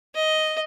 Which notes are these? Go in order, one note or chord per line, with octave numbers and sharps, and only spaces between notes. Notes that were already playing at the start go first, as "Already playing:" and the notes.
D#5